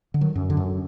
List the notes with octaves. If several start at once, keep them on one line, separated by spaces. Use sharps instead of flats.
D3
D#3 F#3
F#2
D3
F#2